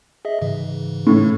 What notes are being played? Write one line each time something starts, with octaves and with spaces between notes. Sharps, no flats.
G#4 D#5 E5
G#2 C#3 E3
A2